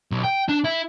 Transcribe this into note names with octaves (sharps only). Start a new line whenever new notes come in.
B1
G5
D4
E4